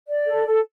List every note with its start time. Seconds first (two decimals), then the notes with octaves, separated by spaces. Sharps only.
0.07 D5
0.25 A4
0.45 A4